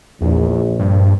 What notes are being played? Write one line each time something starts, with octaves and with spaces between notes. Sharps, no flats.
A#1 E2
G2